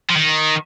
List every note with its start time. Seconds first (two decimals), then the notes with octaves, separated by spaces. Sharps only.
0.10 F3
0.16 D#3